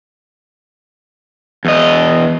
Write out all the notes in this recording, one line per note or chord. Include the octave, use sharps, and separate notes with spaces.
E2 D#5